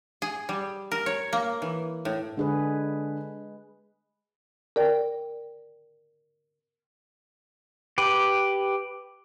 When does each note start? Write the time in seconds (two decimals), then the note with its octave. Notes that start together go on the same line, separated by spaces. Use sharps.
0.22 G#4
0.49 G3
0.92 A#4
1.06 C#5
1.33 A#3
1.62 E3
2.05 A2
2.37 D3 G#3 G#4 B4
4.76 A#4 D5 G5
7.98 G4 B4